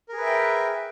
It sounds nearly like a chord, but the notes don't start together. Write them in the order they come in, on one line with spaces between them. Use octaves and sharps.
A#4 G#4 B4 E5 G5